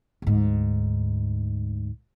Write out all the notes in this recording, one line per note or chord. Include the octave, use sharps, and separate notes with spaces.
D2 G#2